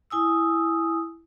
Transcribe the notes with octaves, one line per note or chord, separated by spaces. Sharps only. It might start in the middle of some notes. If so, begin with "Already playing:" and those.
E4 G#5 D#6 E6